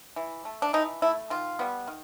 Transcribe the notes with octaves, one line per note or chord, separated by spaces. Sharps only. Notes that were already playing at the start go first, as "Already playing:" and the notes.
E3
A3
D4
E3 D#4
A3 E4
D#3 F4
G3 B3
D#3